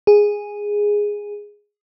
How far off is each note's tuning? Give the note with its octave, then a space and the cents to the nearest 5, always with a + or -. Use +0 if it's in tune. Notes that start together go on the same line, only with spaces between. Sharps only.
G#4 -5